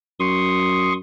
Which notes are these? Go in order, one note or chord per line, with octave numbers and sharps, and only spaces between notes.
F#2 C6 C#6 D#6